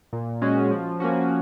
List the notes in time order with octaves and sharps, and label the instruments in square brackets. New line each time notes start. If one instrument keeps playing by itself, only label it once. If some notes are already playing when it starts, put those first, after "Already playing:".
[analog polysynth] A#2
G#3 C#4 F#4
F3
A#3 C#4 F#4